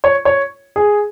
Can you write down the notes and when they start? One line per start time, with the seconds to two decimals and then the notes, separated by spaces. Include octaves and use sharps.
0.04 C#5
0.25 C#5
0.76 G#4